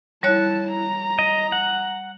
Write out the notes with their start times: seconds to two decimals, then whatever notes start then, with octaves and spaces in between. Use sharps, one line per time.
0.23 G3 E4 C#5 A5 F#6
0.72 A#5
1.19 D#5
1.52 F#5